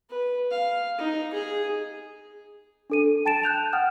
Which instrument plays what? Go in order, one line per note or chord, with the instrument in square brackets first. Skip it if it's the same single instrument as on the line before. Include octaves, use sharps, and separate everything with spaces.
[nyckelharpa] B4
F5
D#4
G#4
[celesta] D4 A4 D#7
G5 A5 A6 D7 E7
F#6 G6 F7
F#5 G5 D#6 F6